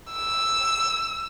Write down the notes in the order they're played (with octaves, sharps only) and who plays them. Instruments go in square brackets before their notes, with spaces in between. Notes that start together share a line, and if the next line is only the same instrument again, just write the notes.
[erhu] E6